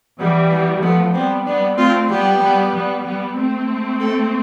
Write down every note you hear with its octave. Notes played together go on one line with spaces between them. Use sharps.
E3 G3 B3
B3
F3 A3 B3
G3 B3 C4
G3 B3 D4
A3 C4 F4
G3 B3 G4
G3 B3
G3 B3
G3 B3
A3 C4
A4